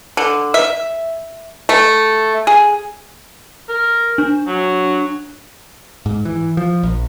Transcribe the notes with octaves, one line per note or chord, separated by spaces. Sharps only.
D3
E5
A3
G#4
A#4
D4
F#3
G#2
E3
F3
A#1